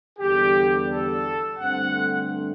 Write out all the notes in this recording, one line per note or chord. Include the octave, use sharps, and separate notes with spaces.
E2 D3 G3 G4
A4
G2 D3 A3 C4 F#5